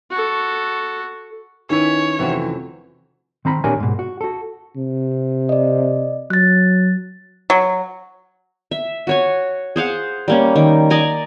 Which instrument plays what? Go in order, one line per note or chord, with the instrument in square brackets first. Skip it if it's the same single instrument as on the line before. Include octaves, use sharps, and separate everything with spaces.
[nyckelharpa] F#4 A4
[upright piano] D#3 [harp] C#4 E4 B4 [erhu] C#5
[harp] F1 E7 [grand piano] E3 C4 F#4
[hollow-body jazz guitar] D#3 C4 A#5 B5
A#2 D4 G4 A#4 C#5 G#5
G#2 B2
F#4
F#4 A4
[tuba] C3
[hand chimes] D5 D#5
[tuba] F#3 [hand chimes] F#6 A6
[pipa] F#3
[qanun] E5
F#4 C#5 G#5
G#4 C5 F5 F#5
G3 A#3 C#4
D#3
D5 D#5 G#5 A#5